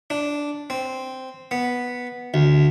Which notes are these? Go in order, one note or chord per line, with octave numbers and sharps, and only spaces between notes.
D4
C4
B3
D2